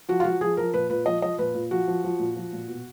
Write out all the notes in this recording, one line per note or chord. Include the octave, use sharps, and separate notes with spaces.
F3 F#4
F4
F3 F#4
F3 G#4
F3 A#4
A#2 B4
A#2 B4
F3 D#5
F3 D#5
A#2 B4
A#2
F3 F#4
F3
F3
A#2
F3
A#2
B2